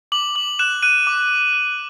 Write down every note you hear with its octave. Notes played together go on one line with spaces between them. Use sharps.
D6 F#7
D6 F#7
F#6 E7
F#6 D#7
D6
D6
F#6